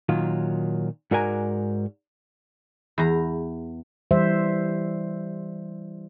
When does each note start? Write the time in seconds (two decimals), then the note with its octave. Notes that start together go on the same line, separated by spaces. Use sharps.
0.09 A#2 D#3 F#3 F4
1.11 G#2 F#4 A#4 D5 G#5 A#5
2.98 E2 A#5
4.11 E3 G3 C5 E5